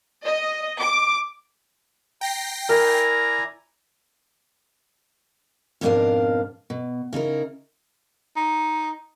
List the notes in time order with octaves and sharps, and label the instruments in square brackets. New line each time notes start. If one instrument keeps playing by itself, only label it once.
[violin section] D#5
D6
[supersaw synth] G5 A#6 C7 [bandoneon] A#5
[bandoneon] E4 D5 G#5 [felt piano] A#4 [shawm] A#5
[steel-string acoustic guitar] F2 G#2 B2 D4 A#4 F5
B2
C#3 D#4 E4 A#4
[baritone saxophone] D#4